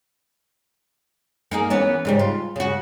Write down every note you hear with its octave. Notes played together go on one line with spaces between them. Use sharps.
A#3 D#4 G#4
E3 B3 C#4
G#2 C#3 G3
F4
C#3 F#4